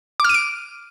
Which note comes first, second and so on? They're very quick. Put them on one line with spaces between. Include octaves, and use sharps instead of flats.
D6 F6 D#7 D7